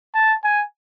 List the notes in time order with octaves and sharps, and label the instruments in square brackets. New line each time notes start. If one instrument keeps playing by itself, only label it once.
[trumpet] A5
G#5